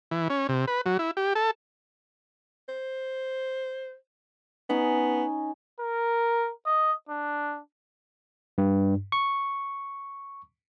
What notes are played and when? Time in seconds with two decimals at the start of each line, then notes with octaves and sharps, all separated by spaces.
0.11 E3
0.30 C#4
0.49 C3
0.68 B4
0.86 F#3
0.99 E4
1.17 G4
1.35 A4
2.68 C5
4.69 B3 C#4 D#4
5.80 A#4
6.66 D#5
7.09 D4
8.58 G2
9.12 C#6